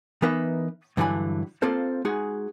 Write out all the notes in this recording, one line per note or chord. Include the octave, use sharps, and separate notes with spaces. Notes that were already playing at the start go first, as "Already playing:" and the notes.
E3 B3 D#4 A#4 B4 E5
G2 D3 E3 F#3 G#5 B5
A#3 C4 F4 A4 C5
G#3 D#4 F#4 G#4